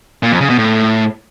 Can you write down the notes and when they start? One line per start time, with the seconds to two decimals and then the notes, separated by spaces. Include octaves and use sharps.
0.23 A#2
0.32 F2
0.41 C#3
0.50 B2
0.59 A2